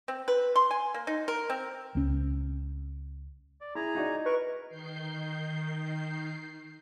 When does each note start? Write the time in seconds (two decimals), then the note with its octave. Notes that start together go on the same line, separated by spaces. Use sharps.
0.08 C4
0.28 B4
0.56 C6
0.71 G#5
0.94 A#3
1.07 D#4
1.28 A#4
1.50 C4
1.95 C#2 C#4
3.61 D5
3.75 E4 G#4 A#5
3.95 D#4 F#4 D5 D#5
4.26 A#4 B4 C#6
4.69 D#3 G6 C7